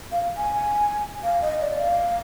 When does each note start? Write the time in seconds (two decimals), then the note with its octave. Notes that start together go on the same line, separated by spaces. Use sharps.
0.12 F5
0.37 G#5
1.24 F5
1.42 D#5
1.61 D5
1.79 F5